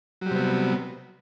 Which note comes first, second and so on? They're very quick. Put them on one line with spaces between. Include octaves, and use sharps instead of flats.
F#3 G3 C3 B3